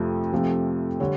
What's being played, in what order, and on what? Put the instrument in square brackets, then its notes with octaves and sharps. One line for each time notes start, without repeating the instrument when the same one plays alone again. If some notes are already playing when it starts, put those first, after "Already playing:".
Already playing: [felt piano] F2 C3 F3 A3
F2 C3 F3 A3
D3 G3 C#5